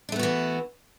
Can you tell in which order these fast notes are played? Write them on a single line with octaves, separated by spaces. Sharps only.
D4 A3 B3 F#4 E3